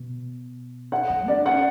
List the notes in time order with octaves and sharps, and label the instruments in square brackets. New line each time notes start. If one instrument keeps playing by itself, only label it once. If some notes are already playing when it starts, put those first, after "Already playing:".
Already playing: [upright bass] B2
[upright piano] F#5
[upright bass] E3
[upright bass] D4 [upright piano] D5
[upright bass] C#4 [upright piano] F#5